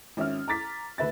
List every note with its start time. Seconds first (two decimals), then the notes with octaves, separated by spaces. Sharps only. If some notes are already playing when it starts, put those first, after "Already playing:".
0.17 G#1 C#4 E5 F6
0.48 A#5 D6 A6 B6
0.98 D2 B4 E5 A6